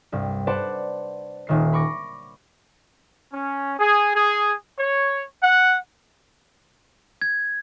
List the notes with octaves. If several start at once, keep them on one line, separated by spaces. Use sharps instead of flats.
C2 G2
B4 C5 D5 F#5 A5
D#1 D#3 C7
B5 C#6 D6 A#6
C#4
G#4
G#4
C#5
F#5
G#6